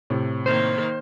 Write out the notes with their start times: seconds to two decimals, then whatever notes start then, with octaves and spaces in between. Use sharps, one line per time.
0.10 A2 C3
0.46 D#3 A#3 C5